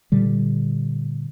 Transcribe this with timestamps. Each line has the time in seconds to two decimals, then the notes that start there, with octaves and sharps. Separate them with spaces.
0.12 A#2 D3 G3